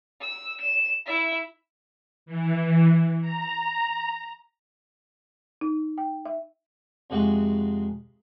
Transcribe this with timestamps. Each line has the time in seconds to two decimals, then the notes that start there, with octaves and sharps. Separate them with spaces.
0.21 E6
0.60 E7
1.06 E4 E5
2.26 E3
3.22 A#5
5.61 D#4
5.98 G5
6.26 E5
7.10 F2 C3 G#3 F#4 G#4 C#6